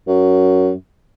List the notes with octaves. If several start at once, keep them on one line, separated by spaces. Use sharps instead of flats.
F#2